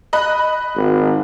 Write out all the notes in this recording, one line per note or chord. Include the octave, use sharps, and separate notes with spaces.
D#5 B5 F#6
G#1